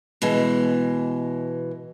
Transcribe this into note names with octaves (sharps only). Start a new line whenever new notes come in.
B2 E3 G#3